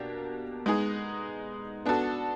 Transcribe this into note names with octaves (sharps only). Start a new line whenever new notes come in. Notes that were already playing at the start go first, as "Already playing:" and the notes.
Already playing: B2 A#3 D4 G4
G#3 B3 D#4 G#4
B3 D4 F#4 A4